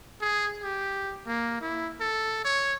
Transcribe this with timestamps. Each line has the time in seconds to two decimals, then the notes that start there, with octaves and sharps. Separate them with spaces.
0.21 G#4
0.63 G4
1.26 A#3
1.61 E4
2.00 A4
2.45 C#5